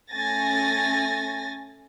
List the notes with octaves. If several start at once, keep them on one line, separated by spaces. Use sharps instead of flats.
A3 C#4 G#5 A6 A#6